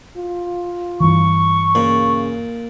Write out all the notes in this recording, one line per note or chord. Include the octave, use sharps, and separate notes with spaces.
F4
G2 E3 C#6
A#2 C#3